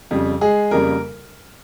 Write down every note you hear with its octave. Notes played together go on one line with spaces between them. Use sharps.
F2 C#3 G3
G#3 G#4
F2 C#3 G3 A#3 A#4